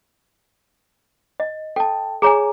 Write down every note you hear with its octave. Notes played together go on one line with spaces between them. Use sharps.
D#5
A4 G5 A5
G#4 C#5 G#5 A#5 D6